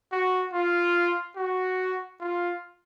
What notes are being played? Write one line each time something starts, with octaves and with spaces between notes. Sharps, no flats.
F#4
F4
F#4
F4